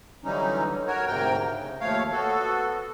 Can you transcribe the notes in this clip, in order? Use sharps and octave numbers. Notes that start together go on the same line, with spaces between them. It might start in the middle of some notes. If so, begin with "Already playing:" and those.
D3 E3 F#3 G3 C#4 D#4
F#4 A#4 C#5
D2 G#2 C3 A#4 G5
C#3
D#2 F3 A3 C#5 F5
B3 F#4 A4